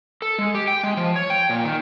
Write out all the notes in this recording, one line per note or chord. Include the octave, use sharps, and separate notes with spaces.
A4
G#3
G4
G5
G#3
F3
C#5
G5
A#2
D#3